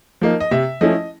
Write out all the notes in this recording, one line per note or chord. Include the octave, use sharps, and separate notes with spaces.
F3 A#3 D#4
D#5
C3 E5
F3 A3 C#4 E4 D#5